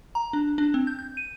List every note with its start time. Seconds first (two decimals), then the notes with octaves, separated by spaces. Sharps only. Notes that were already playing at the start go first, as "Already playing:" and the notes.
0.15 A#5
0.33 D4
0.58 D4
0.74 C4
0.87 G6
0.99 G6
1.17 D#7